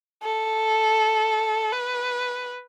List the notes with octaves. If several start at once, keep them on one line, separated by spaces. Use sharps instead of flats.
A4
B4